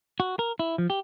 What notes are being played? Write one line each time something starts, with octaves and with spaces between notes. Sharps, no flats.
F#4
A#4
E4
F3
G4